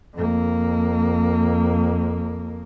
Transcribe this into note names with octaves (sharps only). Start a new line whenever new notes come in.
F2 A#3